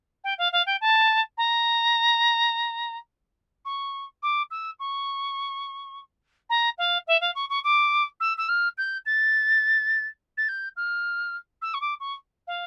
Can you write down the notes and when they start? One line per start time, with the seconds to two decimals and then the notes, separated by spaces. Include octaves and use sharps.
0.24 G5
0.38 F5
0.52 F5
0.66 G5
0.81 A5
1.37 A#5
3.65 C#6
4.22 D6
4.50 E6
4.79 C#6
6.49 A#5
6.78 F5
7.07 E5
7.21 F5
7.35 C#6
7.49 C#6
7.64 D6
8.20 E6
8.37 E6
8.48 F6
8.77 G6
9.05 A6
10.37 A6
10.48 G6
10.76 F6
11.62 E6
11.74 C#6
11.81 D6
12.00 C#6
12.47 F5